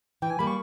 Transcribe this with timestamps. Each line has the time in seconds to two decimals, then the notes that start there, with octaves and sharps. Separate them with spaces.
0.22 E3 G5
0.30 G#5
0.39 G3 A#3 B5
0.47 C#6